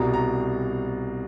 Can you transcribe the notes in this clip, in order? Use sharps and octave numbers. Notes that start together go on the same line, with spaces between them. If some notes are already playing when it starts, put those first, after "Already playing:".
Already playing: C2 B2 G3 A#5
A#5